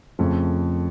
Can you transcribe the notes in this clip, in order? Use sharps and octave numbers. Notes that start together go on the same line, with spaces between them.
F2 C#3 F3 A3